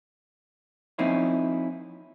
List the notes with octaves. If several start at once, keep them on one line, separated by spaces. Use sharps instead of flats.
F3 A#3 C4 C#4 D#4 E4